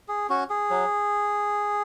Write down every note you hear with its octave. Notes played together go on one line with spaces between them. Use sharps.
G#4
C#4 F#4
G#4
F#3